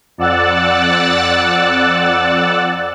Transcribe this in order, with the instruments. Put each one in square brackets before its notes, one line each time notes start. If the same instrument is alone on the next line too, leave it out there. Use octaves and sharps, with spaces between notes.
[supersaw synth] F2 D5 F#5 E6 F#6 A6